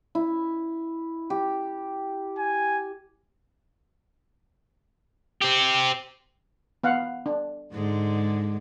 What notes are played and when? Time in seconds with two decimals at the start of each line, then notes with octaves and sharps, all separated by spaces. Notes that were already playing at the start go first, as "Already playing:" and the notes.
0.15 E4
1.30 G4
2.39 G#5
5.42 C4 G4
6.83 B3 F5 F#5
7.26 D4
7.73 G#2 D3 G#3